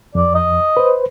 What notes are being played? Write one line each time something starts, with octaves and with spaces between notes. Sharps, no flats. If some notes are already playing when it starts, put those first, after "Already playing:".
F2 D5
D#5
B4 C5